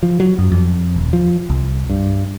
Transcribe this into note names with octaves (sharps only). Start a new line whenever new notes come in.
F3
F#3
F#2
F2
D#1
F3
C2
G2